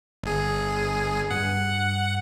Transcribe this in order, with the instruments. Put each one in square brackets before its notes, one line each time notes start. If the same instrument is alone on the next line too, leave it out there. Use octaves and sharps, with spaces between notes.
[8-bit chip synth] G1 G#4
[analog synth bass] G2 [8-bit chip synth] F#5